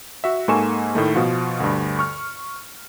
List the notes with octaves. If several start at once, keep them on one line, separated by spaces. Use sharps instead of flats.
F#4 E5
G#2 A#3 A4 G#5 C#6 E7
A2 D#3 A3
B2 F3 F4 F#4
D2 G2
C#6 F6